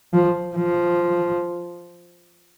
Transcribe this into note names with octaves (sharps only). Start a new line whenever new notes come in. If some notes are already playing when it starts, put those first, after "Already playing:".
F3
F3